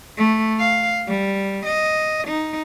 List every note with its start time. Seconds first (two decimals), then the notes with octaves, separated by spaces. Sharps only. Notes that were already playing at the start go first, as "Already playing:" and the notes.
0.18 A3
0.59 F5
1.07 G3
1.66 D#5
2.28 D#4